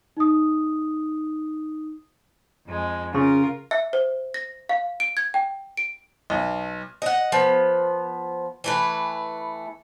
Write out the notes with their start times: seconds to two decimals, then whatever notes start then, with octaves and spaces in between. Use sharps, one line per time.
0.17 D#4 D#6
2.66 F2 G#3
3.15 C#3 F4 A#4
3.71 E5
3.93 C5
4.34 A#6
4.69 F5
5.00 D7
5.17 G#6
5.34 G5
5.77 D7
6.30 B1
7.02 D#5 F#5
7.32 F3 B3
8.64 E3 A3 B4